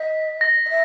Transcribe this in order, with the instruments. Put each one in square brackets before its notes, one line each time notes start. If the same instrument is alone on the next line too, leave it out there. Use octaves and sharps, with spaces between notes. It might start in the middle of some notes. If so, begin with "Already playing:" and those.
Already playing: [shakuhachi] D#5 [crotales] B6
[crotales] A#6
[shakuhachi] D#5
E5